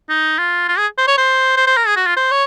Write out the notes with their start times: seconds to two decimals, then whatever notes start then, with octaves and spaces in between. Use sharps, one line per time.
0.09 D#4
0.38 F4
0.68 F4
0.78 G#4
0.98 C5
1.08 C#5
1.17 C5
1.57 C5
1.67 C5
1.77 A#4
1.87 G#4
1.97 F#4
2.07 F4
2.16 C5
2.31 C#5